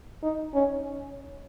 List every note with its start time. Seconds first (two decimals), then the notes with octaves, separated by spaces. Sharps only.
0.23 D#4
0.54 C#4